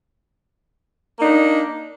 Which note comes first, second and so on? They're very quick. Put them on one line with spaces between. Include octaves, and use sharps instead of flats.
A#3 D#4 D4